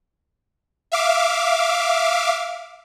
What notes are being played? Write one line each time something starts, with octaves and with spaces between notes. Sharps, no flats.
E5 F5 D6